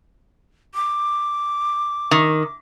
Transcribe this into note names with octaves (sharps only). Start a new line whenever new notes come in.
D6
D#3